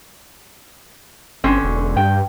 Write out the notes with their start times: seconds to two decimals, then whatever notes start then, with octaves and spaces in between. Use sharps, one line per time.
1.44 G1 D3 C4 C#4
1.64 E1
1.97 G2 G5